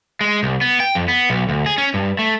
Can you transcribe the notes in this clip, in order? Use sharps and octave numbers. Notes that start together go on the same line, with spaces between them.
G#3
C2
B3
G5
F2
B3
B1
D2
G#4
C#4
G2
A3